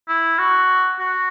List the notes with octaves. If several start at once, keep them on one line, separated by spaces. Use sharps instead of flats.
E4
F#4
F#4